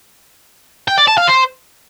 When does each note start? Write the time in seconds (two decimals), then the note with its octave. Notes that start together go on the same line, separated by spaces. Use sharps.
0.88 G5
0.98 D5
1.08 A5
1.17 F5
1.27 C5